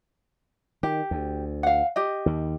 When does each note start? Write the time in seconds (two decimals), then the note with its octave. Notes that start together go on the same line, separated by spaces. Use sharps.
0.83 D#3 G4
1.11 D2
1.63 F5 F#5
1.96 G4 D#5
2.26 D#2 D#3